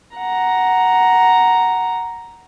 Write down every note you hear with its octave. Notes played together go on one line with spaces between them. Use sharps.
F#5 A#5